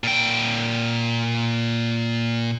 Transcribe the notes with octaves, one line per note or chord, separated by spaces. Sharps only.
A#2 G5